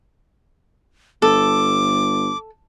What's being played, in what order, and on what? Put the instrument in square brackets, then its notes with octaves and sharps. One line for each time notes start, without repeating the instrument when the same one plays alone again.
[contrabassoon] G1 [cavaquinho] A4 [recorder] D6